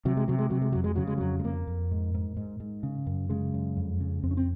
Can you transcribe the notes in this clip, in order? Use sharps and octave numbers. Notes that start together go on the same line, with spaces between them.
C3 F#3
G#3
C3 F#3
G#3
C3 F#3
G#3
F2 F#3
G#3
C#3 F#3
G#3
F2 F#3
G#3
F2 A#3
F2
G#2
G#2
G#2
G#2
C#3
F#2
C#3 G#3
F#2
F2
C#3
F2 C4
C#4
C4